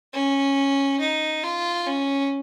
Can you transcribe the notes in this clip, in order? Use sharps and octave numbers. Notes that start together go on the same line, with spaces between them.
C#4
D#4
F4
C#4